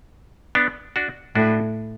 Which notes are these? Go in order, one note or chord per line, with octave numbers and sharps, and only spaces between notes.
B3 D4
D4 F#4
A2 D4 F#4